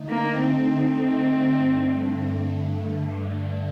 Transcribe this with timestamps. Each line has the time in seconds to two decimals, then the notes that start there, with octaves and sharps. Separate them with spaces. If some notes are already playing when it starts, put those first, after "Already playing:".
Already playing: D3 A3 D#4
0.10 A#3
0.39 C4
1.55 G2 D3 A3